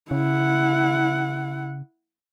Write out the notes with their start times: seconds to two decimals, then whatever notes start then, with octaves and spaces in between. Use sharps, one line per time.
0.11 C#3 E4 F#5